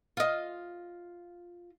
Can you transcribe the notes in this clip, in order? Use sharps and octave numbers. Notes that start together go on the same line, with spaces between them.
F4 D#5